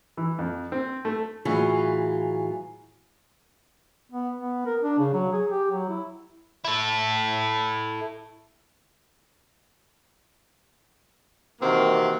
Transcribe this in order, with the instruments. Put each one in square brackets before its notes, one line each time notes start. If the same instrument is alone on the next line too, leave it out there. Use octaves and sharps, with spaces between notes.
[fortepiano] E3
F2
C4
A3
[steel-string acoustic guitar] A2 E3 F#3 F4 G#4
[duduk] B3
B3
A#4
D4
C#3
F#3
G#4
G4
F#3
E4
[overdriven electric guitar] E4 A4
[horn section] C3 D#3 E3 A#3 C4 F#4